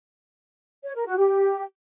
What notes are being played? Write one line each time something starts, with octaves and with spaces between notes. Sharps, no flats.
C#5
A#4
F#4
G4